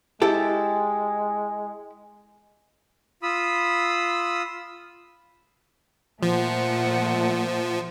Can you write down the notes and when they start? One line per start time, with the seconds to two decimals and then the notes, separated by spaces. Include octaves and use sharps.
0.22 G#3 E4 G4 A4
3.23 F4 B5 D#6 E6
6.23 A#2 F3 A3 F#5